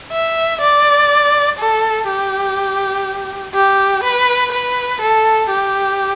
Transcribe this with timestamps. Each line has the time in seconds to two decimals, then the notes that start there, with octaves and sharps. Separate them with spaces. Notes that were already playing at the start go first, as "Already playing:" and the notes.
0.12 E5
0.61 D5
1.59 A4
2.08 G4
3.54 G4
4.03 B4
4.52 B4
5.01 A4
5.50 G4